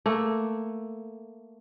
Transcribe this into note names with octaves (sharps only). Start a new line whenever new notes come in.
A3 A#3